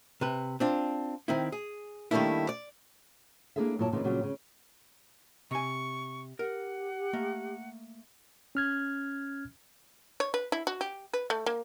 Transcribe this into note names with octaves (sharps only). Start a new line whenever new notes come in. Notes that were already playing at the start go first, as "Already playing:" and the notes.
C3 B4
C4 D4 F4
D#3 C4 E4
G#4
D#3 G3 A3 A#3 D4 E4
D5
A#3 D4 E4 G#4 A4 E5
G2 A#2 F#3 E4 C#5 A5
A#2 C#3 E3 B3 D#4 F4
A#2 C#3 F#3 G3 F#4
C#3
C3 G#5 C#6
G4 A#4 F#5
A3 A#3
C#4 F6 G#6
C#5
B4
E4
F#4
G4
B4
A3
A#3